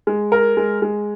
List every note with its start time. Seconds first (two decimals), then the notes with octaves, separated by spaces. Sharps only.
0.07 G#3
0.32 A#4
0.57 G#3
0.82 G#3